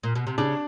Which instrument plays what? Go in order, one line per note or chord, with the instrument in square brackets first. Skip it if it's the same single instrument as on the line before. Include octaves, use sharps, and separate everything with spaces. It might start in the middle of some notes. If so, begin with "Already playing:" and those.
[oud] A#2
B2
C3
[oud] C#3 [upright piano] D4